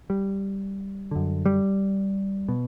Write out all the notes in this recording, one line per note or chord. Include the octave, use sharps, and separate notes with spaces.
G3
F#2 D3
G3
B2